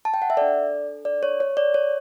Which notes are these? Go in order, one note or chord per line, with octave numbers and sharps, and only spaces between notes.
A5
G5
F#5
E5
D4 A4 D5
D5
C#5
C#5
D5
C#5